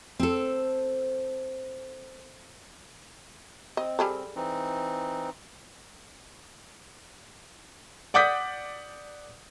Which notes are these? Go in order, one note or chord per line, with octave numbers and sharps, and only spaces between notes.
C4 A4
C4 D#5
G3 G#4 A4
E3 C4 D#4
D5 F#5 D6 D#6 G6 B6